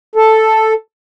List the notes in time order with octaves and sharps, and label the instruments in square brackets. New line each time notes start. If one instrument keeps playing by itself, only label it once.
[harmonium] A4